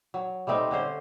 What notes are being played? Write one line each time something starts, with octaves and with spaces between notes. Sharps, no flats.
F#3
G3 A3 C4 D#4
D3 C#4 C5